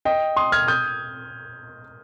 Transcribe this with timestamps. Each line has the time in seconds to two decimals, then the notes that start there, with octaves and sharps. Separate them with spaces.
0.05 D#5 G5
0.36 C6 D#6
0.52 F6 G#6
0.68 D#6 G6